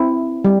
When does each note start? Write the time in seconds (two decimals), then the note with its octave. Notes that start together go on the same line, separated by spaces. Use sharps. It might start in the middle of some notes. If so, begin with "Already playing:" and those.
Already playing: C4 E4
0.45 G3